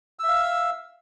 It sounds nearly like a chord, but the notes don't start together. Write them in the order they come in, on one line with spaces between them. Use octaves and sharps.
E6 E5 F5